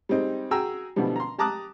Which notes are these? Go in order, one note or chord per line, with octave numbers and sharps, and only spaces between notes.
G3 G#3 C4 D#4
F#4 G#4 G5 G#5 A#5 E6
B2 D3 E3 F3 G3
A#5 C6
G4 A5 A#5 D6 D#6 F#6